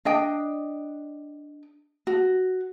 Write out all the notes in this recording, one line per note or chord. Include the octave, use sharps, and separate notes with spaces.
D4 D#5 G5
F#4